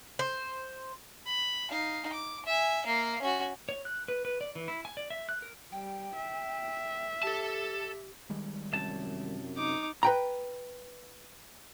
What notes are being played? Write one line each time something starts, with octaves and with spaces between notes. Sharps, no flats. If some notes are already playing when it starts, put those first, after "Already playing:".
C5
B5
D#4 F5
D6
E5 G#5
A#3 F5
C#4 F#4
C#5
F#6
B4
B4
D5
E3
E4
G#5
D5
E5
F#6
A#4
G3 G5
E5
G4 A4 A5
D#3 G3 G#3
C2 F#2 A5
D#4 D6
B4 G5 A#5